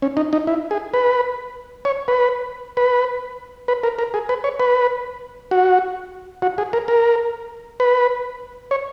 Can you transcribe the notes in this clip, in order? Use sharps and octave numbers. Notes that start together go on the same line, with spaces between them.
C#4
D#4
D#4
E4
G#4
B4
C#5
B4
B4
B4
A#4
A#4
G#4
B4
C#5
B4
F#4
F#4
G#4
A#4
A#4
B4
C#5